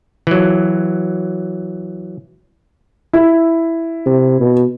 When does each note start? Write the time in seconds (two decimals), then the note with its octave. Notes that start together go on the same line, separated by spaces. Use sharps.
0.27 E3 F#3
3.13 E4
4.06 C3
4.40 B2